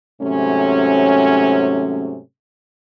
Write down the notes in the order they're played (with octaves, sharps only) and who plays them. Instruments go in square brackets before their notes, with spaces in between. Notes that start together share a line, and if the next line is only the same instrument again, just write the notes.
[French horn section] G#2 C3 F#3 A3 C#4